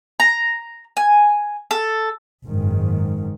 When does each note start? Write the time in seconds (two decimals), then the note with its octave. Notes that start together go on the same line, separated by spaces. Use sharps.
0.20 A#5
0.97 G#5
1.71 A4
2.44 F#1 G#2 D#3